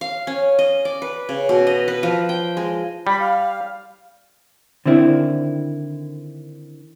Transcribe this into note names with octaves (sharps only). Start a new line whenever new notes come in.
F5
C#4
D#5
D5
B4
C#3
B2
D#5
B4
F3
G5
G#3
G3 B5
F5
D3 D#3 C4 E4